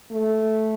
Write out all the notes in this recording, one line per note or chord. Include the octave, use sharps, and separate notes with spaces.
A3